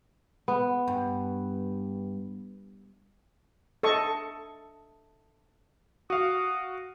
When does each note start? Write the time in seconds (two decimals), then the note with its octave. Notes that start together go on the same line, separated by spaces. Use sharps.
0.48 B3
0.88 G2
3.83 A4 D#5 C#6
6.10 F#4 F5 D#6